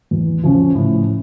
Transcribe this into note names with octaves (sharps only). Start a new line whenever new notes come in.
E2
C#3 F3 C#4
A2